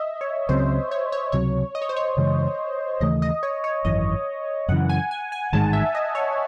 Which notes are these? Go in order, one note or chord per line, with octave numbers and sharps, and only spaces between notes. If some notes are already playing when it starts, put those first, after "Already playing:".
Already playing: D#5 E5
C#5
C#2 C#3 F#3 C4 C5
C#5
C#5
C#2 C3 F#3 C#5
D#5
C#5
C5
C#5
F#2 C#3 E3 G#3
D#2 C#3 E3 A3 D#5
D#5
C#5
C#5
G#1 F#2 E3 D#5
F#2 C#3 E3 F#5
G#5
G#5
G#5
A1 G#2 D#3 G#3 A5
E5
D#5
C#5